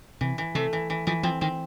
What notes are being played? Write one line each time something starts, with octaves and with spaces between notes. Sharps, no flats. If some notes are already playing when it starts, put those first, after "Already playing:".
C3 E3
E3
C3 A3
E3
E3
E3 F3
F3 C4
D#3 C4